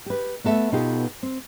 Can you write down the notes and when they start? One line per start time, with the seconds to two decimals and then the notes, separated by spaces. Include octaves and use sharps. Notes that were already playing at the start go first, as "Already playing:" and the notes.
0.06 G4 B4
0.44 A3 B3 A4 E5
0.72 B2 B3 D#4 F4 G4 A4
1.23 C4